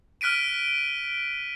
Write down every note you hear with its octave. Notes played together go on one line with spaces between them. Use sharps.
F6 F#6 B6 D7 D#7